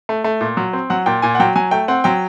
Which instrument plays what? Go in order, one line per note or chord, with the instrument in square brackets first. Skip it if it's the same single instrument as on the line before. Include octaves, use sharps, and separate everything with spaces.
[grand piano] A3
A3
A#2
F#3
C4
F#3 F#5
A#2 G5
A#2 G#5
F#5
F#3 G5
F#3 G#5
A3 G5
C4 F#5
F#3 G5